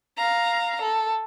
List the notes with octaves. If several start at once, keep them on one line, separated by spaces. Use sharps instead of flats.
F5 A#5
A4